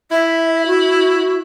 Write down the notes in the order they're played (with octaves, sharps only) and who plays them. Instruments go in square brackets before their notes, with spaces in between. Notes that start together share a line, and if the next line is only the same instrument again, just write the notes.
[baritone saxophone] E4 [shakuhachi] E5
[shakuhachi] F#4